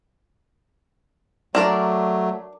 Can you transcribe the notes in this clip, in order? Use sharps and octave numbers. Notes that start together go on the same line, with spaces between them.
F#3 A3 D4 A#4 D5